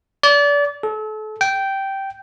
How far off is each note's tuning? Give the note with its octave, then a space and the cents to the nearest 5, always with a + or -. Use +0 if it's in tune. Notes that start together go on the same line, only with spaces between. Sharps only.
D5 -30
A4 -35
G5 -10